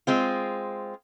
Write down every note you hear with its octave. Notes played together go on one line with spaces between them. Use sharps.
G#3 C4 F4